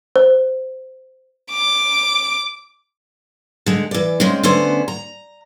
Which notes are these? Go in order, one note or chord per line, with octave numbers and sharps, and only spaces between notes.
C5
D6
D3 G#3
E3 D5
C#3 G#3 C4
D3 A3 B3 C#4 C5
A#5